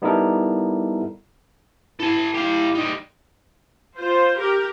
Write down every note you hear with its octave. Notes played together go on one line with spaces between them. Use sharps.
G3 B3 D#4 E4 A4 A#4
E4 A4 G#5
G4 F5
G3 D#4
F4 C5
G4 A#4